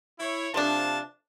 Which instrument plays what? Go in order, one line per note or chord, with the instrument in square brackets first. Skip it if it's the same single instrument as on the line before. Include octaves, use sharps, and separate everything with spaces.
[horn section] E4 C#5
[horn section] C3 F5 A5 [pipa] F3 A3 D4